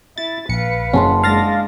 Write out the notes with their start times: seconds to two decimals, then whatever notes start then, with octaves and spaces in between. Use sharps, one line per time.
0.18 E4 A6
0.49 A#1 B4 F5 C#7
0.93 F#1 C#4 F#5 A5 C6
1.24 G#3 D4 F5 A6 A#6